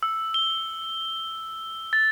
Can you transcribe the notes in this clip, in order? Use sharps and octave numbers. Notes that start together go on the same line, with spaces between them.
E6
G7
A6